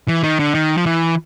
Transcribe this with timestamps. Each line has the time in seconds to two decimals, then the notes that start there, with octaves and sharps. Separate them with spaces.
0.08 E3
0.23 D#3
0.39 D3
0.55 D#3
0.77 F3
0.86 E3